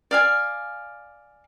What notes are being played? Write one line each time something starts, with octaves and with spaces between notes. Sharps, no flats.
D5 F5 G#5